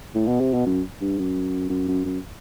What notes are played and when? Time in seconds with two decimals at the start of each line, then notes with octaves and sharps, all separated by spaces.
0.15 A2
0.27 B2
0.40 C3
0.54 B2
0.66 F#2
1.01 G2
1.18 F#2
1.70 F#2
1.88 F#2
2.05 F#2